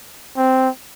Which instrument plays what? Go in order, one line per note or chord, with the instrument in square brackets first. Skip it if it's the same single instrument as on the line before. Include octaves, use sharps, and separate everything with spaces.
[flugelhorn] C4